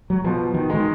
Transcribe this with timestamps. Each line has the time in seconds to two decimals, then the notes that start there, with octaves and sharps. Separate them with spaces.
0.10 F#3
0.24 B2 F3
0.54 D#3
0.69 D#3 G#3 D#4